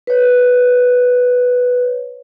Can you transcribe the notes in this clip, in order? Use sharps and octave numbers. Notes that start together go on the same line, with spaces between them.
B4 C#5